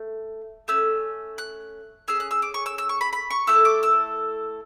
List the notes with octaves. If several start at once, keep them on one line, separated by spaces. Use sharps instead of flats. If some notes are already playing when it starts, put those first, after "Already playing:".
Already playing: A3
A3 C#4 E6
F#6
C#4 G#4 E6
F#6
E6
D6
C#6
E6
E6
C#6
B5
B5
C#6
A3 E4 A4 E6
D6
E6